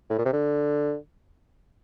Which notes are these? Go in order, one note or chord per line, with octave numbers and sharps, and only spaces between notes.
A2
A#2
C3
D3